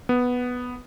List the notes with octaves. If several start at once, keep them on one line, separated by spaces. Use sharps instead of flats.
B3